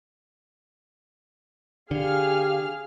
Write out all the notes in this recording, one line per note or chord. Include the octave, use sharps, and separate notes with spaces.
D3 G4 G#4 F5 F6